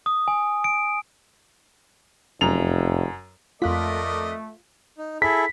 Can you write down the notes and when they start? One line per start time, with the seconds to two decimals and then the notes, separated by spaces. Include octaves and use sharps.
0.06 D#6
0.28 G#5
0.64 D7
2.41 F1 F#2 F7
3.62 F2 A3 F4 A#4 D5 D#5 F#6 B6
4.98 D#4
5.22 E4 G#4 A4 B6